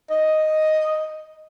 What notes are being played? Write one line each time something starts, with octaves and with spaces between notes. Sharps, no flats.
D#5